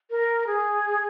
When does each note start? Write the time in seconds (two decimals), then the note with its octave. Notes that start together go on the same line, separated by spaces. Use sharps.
0.10 A#4
0.47 G#4